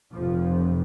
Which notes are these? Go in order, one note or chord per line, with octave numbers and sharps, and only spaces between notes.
F1 F2 C3 F3